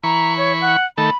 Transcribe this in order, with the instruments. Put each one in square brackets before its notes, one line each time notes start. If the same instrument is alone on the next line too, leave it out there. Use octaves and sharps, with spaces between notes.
[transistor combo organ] E3 B5 C#6 [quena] A#5
[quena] C#5
F#5
[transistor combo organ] D#3 A3 A4 [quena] B5